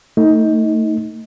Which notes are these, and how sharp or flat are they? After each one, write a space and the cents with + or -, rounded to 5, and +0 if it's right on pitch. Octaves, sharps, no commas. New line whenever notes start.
A3 +25 D#4 +20